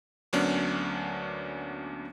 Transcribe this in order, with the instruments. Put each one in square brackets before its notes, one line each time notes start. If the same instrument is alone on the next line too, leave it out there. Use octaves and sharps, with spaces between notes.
[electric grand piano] D2 F#3 A#3 B3 C#4 D4